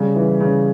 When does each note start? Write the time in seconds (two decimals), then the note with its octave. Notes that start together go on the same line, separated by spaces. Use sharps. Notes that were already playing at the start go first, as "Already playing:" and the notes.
Already playing: C#3 G3
0.15 E3
0.40 C#3